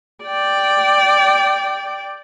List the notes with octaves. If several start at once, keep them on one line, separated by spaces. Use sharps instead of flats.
D5 G5